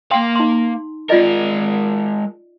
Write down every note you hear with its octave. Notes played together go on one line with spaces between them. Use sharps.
A#3 F5 G5 C6
D#4 C6
G#3 F4 A#4 D5 D#5